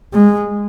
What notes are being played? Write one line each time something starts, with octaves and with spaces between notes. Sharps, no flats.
G#3